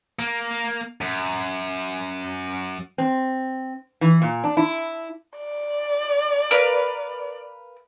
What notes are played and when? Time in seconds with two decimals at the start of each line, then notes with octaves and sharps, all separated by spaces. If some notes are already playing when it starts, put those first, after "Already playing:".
0.19 A#3
1.01 F#2
2.98 C4
4.01 E3
4.22 A#2
4.44 D4
4.57 E4
5.37 D5
6.51 A#4 B4 F5